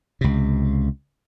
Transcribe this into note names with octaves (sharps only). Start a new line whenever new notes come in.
C#2 C3